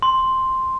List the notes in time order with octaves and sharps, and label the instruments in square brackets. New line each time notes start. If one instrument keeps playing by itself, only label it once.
[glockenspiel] C6